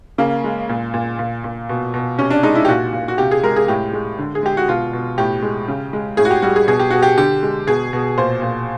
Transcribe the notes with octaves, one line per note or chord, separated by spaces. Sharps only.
C#3 A#3
G#3
A#2
A#2
A#2
A#2
B2
B2
C3 C#4
D4
G#3 D#4
E4
G4
A#2 F#4
A#2
F#4
C3 G4
G#4
G#3 A#4
G#4
A2 G4
G#3
D3
G#4
G#3 G4
F#4
B2 F4
B2
A2 G4
G#3
C#3
G#3
A2 G#4
F#4
G4
G3 F#4
G#4
B2 G#4
G4
B2 F#4
G4
D3 G4
G#3
B2 G#4
B2
A#2 C5
A#2